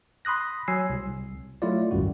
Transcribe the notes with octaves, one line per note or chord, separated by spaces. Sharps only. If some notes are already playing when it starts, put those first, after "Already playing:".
B5 C6 D#6 F#6 A#6
F#3 G#5 E6 C7
C2
F#3 A3 E4 F4 D5
G#1 C#2 F#2 G3 F#4